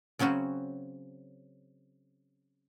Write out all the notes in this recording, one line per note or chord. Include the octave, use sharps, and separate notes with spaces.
C#3 F#3 C4 C#4 F#4